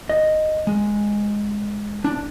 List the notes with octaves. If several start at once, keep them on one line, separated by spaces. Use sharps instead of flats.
D#5
G#3
D4